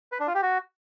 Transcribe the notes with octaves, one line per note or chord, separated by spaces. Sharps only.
B4
D4
F4
G4
F#4